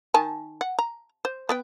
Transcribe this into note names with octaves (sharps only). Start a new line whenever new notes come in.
D#3 G#5 A5
F#5
A#5
C5
B3 B4 G5